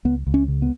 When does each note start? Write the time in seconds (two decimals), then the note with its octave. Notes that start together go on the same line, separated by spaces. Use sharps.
0.05 C#2 B3
0.27 C#2
0.34 C#4
0.48 C#3
0.62 B3